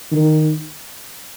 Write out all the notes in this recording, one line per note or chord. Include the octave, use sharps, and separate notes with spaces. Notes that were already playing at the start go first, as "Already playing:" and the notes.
D#3